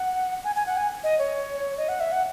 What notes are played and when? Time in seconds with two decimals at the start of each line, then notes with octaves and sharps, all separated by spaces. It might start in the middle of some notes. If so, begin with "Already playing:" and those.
Already playing: F#5
0.44 G#5
0.55 G#5
0.66 F#5
0.77 G#5
1.04 D#5
1.19 C#5
1.78 D#5
1.89 F#5
2.00 E5
2.12 F#5